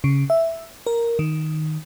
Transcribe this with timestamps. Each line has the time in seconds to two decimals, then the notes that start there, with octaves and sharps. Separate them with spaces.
0.04 C#3
0.30 E5
0.86 A#4
1.19 D#3